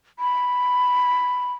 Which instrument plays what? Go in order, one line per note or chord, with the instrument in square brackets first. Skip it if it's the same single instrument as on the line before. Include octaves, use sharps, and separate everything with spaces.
[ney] B5